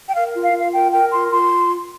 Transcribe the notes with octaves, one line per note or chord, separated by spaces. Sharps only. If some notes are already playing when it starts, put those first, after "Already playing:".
G5
A#4 F5
F4
F5
F4
F5
A#4 G5
A#4 G5
F4 C6
F4 C6